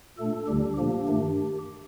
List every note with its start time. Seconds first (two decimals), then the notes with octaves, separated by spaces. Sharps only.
0.18 A#2 A3 D4 A4
0.48 D2 D3 G3 D4 G4
0.77 A#2 F3 A#3 D4 G4
1.08 G2 D#3 A3 D4